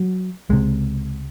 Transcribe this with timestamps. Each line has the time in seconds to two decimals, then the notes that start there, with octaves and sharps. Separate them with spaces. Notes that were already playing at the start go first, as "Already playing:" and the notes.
Already playing: F#3
0.50 C#2 C3 G#3